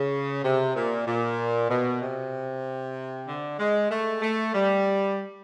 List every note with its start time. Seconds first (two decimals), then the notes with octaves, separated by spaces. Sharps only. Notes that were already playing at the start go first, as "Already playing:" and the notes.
Already playing: C#3
0.44 C3
0.76 A#2
1.07 A#2
1.70 B2
2.02 C3
3.28 D3
3.60 G#3
3.91 A3
4.22 A3
4.54 G3